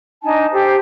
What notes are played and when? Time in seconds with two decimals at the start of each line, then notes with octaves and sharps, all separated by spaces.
0.23 D4 D#4 G#5 A5
0.52 G4 A4 C5